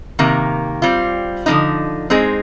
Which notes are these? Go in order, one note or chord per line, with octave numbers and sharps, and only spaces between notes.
C3 D#3 A#3
G3 C4 F4
D3 F3 C4 D#4
G#3 C4 D#4 G#4